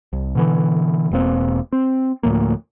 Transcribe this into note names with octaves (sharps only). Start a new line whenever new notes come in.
C2
B2 D3 E3
E1 B2 A#3 C4
C4
D2 A2 F3 A#3